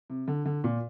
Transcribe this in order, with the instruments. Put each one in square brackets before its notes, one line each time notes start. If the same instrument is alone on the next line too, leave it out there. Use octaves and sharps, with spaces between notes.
[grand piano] C3
D3
D3
A#2